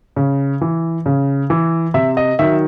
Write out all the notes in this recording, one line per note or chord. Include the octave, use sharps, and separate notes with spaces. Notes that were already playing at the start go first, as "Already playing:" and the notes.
C#3
E3
C#3
E3
C3 E5
D#5
D#3 F#3 E5